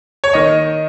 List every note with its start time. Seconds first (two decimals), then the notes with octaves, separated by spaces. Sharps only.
0.24 C#5
0.33 D#3 D#5